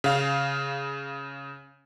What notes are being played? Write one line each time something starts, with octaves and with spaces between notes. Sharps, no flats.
C#3 F5 F6